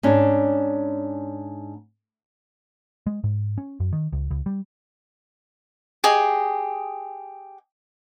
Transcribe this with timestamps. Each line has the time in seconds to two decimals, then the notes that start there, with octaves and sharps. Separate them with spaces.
0.03 G#2 C#4 D4
3.07 G#3
3.24 G#2
3.58 C#4
3.80 F#2
3.93 D#3
4.12 C#2
4.31 C#2
4.46 G3
6.04 G4 G#4 D#5